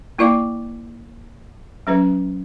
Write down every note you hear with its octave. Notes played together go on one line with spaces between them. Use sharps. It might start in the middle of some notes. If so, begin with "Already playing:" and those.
A#3 E4 A#4 D5 F5 D6
F#3 C#4 B4 E5